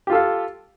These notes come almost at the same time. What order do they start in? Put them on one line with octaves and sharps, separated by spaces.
G4 F4 A4 F5